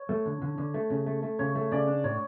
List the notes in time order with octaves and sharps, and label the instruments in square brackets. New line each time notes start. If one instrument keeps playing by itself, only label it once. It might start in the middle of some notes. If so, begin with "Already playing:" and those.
Already playing: [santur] C#5
[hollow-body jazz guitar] A3
D3
D3
D3
A3
C#3
A3
A3
[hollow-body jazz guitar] C#3 [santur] C#5
[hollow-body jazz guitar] A3
[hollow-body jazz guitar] C#3 [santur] D5
[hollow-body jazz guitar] D4
[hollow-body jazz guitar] A2 [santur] C#5